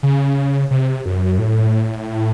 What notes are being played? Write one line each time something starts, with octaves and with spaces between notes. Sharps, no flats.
C#3
C3
F#2
A2